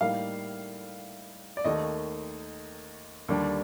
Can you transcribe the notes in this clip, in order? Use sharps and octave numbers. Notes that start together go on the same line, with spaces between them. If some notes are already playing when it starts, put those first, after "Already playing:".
A2 G3 A#3 D#4 F5
D5
D#2 D#3 A3 D#5
D#2 D3 G3 D4